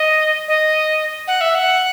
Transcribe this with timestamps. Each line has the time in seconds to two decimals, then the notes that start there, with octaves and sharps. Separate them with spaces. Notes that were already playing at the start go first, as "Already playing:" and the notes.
Already playing: D#5
0.48 D#5
1.28 F#5
1.41 E5
1.55 F#5